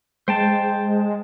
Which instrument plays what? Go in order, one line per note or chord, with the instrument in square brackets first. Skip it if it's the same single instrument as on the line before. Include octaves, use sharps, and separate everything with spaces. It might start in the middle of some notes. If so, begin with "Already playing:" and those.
[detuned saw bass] G#3 [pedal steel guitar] C5 G5 A5